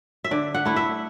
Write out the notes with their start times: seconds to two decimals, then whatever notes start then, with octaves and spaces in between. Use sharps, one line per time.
0.24 E5
0.31 D3 D5
0.54 F#5
0.65 A3 E4
0.76 E5